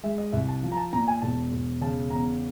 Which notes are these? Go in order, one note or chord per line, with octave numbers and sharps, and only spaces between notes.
G#3 E5
D#5
C2 E5
A5
F3
A#5
A5
A#2 A#5
G#5
E1 A5
E1
C#3 A5
E2 A#5